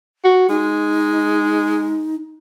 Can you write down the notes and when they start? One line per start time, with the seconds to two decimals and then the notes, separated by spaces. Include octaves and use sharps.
0.24 F#4
0.49 G#3 D#4